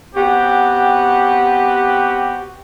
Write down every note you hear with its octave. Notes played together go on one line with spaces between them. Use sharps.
B3 C4 F#4 G4